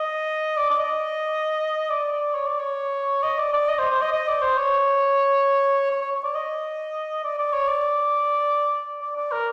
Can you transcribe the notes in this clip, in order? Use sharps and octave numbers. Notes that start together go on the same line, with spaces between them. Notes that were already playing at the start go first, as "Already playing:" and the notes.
Already playing: D#5
D5
D5
D#5
D5
D5
C#5
D5
C#5
D#5
D5
D5
D#5
C5
C5
D#5
D#5
D5
C5
C#5
C#5
C#5
C#5
D5
D#5
D5
D5
C#5
D5
D5
D5
A#4